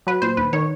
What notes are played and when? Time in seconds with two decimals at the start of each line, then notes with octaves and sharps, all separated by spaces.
0.07 F#3 B4
0.22 A#2 C5
0.37 D#2 B4
0.53 D#3 C#5